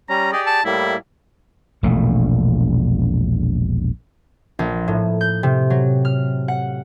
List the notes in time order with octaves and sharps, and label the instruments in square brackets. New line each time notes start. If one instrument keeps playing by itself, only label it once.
[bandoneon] G3 C#4 [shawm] A#5
[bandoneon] G4 G#4 D5 [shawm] D#5
[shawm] A5
[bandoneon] A2 G3 A#3 [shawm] E4
[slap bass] E1 A#1 B2 A3
[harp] A#1
A2
G6
C3
F#3
F6
F#5